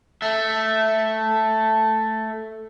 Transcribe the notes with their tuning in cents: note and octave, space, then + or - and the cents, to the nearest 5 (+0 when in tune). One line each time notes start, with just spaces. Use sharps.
A3 +0 E5 +0